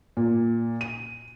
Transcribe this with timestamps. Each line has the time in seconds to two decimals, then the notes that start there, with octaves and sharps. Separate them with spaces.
0.17 A#2
0.81 D#7